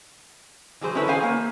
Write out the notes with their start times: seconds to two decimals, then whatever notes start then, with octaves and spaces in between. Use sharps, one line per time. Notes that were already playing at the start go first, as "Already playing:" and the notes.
0.81 E3 F#3 G#4 C5
0.95 C#4 E4 A4 B4 C#5
1.08 G#4 C5 F5 G#5
1.24 A#3